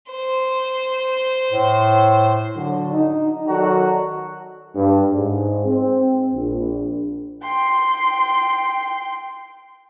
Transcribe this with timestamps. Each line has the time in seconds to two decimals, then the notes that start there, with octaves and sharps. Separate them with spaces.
0.12 C5
1.52 A2
2.57 D3 F#3
2.93 D#4
3.48 D#3 F#3 F#4 A4 D5 A#5
4.75 G2
5.12 G#2
5.65 C4
6.34 A#1
7.43 G5 C6